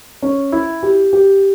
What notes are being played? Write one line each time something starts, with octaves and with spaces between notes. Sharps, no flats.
C#4
E4
G4
G4